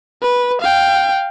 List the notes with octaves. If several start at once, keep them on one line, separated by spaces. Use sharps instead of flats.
B4
F5 G5